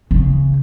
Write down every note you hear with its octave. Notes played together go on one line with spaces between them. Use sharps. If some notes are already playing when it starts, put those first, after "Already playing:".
C#3